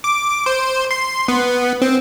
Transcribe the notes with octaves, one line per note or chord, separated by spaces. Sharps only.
D6
C5
C6
B3
C4